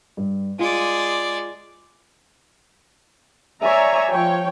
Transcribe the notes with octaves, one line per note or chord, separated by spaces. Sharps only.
G2
G#3 F4 D5
C#5 D5 E5 G#5 A#5
F3 C#5 G5